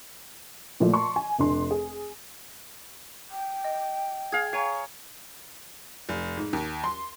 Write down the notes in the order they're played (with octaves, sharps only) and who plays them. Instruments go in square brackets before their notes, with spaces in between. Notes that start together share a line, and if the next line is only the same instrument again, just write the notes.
[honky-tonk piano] A#2 F3 A3 A#3
A5 C6 C#6
G#5
F1 D4 C6
G#4
[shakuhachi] G5
[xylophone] D#5
[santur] G#4 F5 [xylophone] G#6
[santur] C#5 [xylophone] F5 G#5 A#5
[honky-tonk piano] F1
G#2
D#2
C6